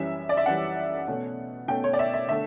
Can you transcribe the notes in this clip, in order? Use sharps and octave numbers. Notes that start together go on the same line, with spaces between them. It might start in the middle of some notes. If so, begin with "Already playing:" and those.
Already playing: F#2 E3 G3 C#4 E5
D5
E5
F#2 E3 G3 C#4 F#5
B2 A3 C#4
B2 A3 C#4 G5
C#5
D5
E5
E5
D3 A3 E5